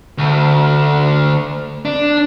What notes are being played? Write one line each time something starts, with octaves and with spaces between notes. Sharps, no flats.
D2
D4